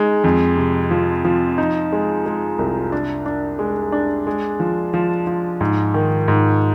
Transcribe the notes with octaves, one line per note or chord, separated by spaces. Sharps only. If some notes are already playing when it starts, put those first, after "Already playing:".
Already playing: G#3 D#4
F2
C3
F3
F3
D#4
G#3
G#3
C2
D4
D4
G#3
D4
G#3
F3
F3
F3
G#2
D#3
G#2